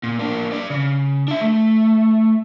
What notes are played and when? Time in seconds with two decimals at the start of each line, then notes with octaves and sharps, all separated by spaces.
0.03 A#2
0.19 A#3 D4
0.52 B4 D5
0.70 C#3
1.28 D4 E5
1.41 A3